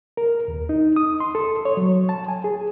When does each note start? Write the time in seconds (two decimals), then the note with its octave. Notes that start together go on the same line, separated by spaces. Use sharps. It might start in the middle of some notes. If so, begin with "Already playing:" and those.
0.17 A#4
0.48 D#2
0.69 D#4
0.96 D#6
1.20 C6
1.35 A4
1.65 C#5
1.77 F#3
2.09 A5
2.28 G#5
2.44 G#4